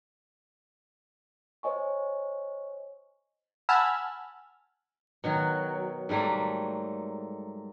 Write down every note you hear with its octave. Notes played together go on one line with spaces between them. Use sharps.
C5 C#5 D#5 G#5 C#6
F#5 G#5 A5 B5 E6 F6
B2 D#3 F#3
G#2 F#3 G3 A3 A#3